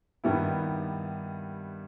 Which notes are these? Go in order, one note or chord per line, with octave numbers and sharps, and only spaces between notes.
G2 D#3 G3 B3 E4